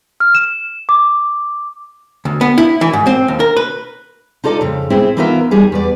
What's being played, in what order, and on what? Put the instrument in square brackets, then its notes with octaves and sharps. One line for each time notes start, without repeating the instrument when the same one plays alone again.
[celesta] F6
E7
D6
[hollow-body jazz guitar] D2
B3
E4
E3
G#2
C4
D#2
A#4
B4
[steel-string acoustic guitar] D#4 F4 A4 D5 D#5
F2 C#3
C4 E4 G#4 C5
E3 B3 D#4 F4 A#4 E5
D#2 D#3 G3 G#4
E2 B4 D5